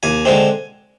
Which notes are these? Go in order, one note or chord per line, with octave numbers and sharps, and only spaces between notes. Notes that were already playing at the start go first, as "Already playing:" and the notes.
D#2 G#5
D3 G#3 C4